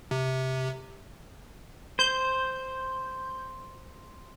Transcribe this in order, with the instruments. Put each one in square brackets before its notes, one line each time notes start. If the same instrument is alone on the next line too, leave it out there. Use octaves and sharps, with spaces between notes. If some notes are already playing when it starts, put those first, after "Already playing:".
[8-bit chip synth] C3
[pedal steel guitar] C5 [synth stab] G6